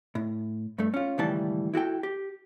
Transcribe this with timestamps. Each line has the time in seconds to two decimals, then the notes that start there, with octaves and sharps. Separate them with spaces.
0.15 A2
0.78 G2 A3
0.94 C#4 F4
1.18 C#2 A2 D#3 E3 G3 A5
1.74 E4 F#4 A4 G5
2.03 G4